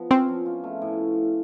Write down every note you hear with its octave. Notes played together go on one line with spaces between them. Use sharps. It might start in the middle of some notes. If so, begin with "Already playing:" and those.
Already playing: F3 B3
C4 C#4
F3
F4
A3
A2